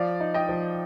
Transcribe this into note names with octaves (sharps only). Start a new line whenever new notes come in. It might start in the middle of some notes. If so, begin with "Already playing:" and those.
Already playing: F3 D5 F5
D#4
D#5 G5
F3